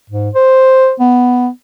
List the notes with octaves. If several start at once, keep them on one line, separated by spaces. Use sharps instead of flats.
G#2
C5
B3